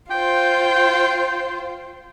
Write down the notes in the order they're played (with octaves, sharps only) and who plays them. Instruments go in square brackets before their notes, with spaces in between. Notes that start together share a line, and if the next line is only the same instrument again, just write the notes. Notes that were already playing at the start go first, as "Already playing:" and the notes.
[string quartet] F4 C5 [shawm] G5